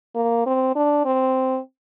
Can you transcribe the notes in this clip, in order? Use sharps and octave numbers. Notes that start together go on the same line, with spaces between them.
A#3
C4
D4
C4